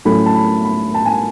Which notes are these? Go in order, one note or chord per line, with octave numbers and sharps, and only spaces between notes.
A2 F#3 A3 C#4 B5
A5
B5
B5
A5
G#5